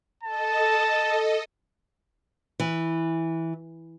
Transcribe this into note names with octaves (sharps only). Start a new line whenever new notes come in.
A4 D#5 A5
E3